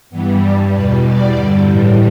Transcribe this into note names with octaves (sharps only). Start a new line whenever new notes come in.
G2 E3 G3 B3
G2 G3 D5
E2 B2 G3 B4
E2 B2 G3 D5
G2 D3 G3
A2 E3 G3